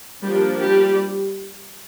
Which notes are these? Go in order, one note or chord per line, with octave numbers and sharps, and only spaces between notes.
F3 G3 A#3 D4 G4
G3 G4